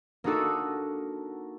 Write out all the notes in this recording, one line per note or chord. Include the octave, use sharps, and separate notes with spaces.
A#3 D4 D#4 F#4 A4 D#6